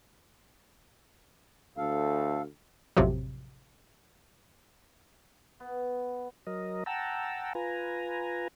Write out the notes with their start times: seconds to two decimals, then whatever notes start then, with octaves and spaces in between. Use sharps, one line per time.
1.77 D2 A4 F5
2.97 A1 F2 C3 F3 F#3
5.60 B3
6.47 F#3 A#4 D#5
6.86 F#5 G5 A5 A#5 E6
7.55 F4 B4 G#5 A#5